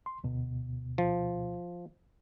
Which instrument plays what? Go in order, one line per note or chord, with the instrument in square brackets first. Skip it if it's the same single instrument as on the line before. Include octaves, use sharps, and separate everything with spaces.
[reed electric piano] C6
D2 B2
[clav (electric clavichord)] F3